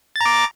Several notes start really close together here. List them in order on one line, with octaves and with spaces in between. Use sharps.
A6 A#5 D6